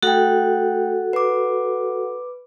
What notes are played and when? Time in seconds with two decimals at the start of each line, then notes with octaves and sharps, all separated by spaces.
0.03 A3 F#4 A4 F#5 G5
1.13 B4 D6